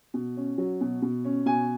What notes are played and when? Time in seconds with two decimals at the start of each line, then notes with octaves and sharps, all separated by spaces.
0.14 B2
0.37 C#4
0.58 F#3
0.81 B2
1.02 B2
1.25 C#4
1.46 B2 G#5